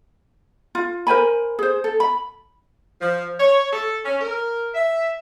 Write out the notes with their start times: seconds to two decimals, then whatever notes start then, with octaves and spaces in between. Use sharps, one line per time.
0.75 F4
1.07 A#4 C5 G#5 B5
1.59 G#4 C5
1.84 A4
2.00 B5
3.00 F3
3.39 C#5
3.71 A4
4.05 C#4
4.20 A#4
4.73 E5